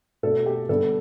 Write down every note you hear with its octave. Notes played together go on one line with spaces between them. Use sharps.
B2 A3 D4 A4
G4
D3 G3 B3 D4 A4